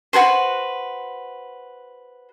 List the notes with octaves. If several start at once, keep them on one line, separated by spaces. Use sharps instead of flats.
F#4 G#4 B4 C5